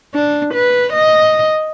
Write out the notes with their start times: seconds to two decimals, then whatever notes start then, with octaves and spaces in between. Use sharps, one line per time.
0.14 D4
0.54 B4
0.93 D#5